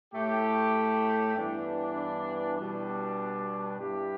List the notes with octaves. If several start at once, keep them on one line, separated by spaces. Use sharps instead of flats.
A2 A3 G4
G2 E3 B3 D4
B2 G3 D4
G2 G3 E4 G4